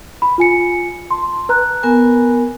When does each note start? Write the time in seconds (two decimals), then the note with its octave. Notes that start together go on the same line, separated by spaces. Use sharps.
0.22 B5
0.38 F4 G#5 C#7
1.11 A5 C6
1.49 B4 A#5 F#6
1.83 B3 A#4 G#5